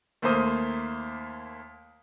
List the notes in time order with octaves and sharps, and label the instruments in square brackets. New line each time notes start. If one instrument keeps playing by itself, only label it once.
[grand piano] D#2 A3 A#3 C5 D#6